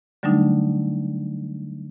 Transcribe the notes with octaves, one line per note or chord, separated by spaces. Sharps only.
D3 F#3 G3 A3 D4 D#4